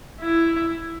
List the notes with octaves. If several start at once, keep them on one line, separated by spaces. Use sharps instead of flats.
E4